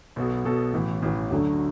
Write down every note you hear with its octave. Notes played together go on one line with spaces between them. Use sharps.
B1 B2 B3 F#4 A4
B1 B2 B3 F#4 A4
A1 A2 E3
A1 A2 E3
D2 D3 F#3 A3 D4